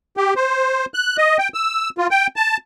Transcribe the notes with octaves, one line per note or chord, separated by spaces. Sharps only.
G4
C5
F#6
D#5
G5
E6
F4
G5
A5